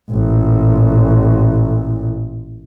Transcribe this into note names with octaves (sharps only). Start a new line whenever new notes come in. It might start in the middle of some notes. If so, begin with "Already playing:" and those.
A1 A#2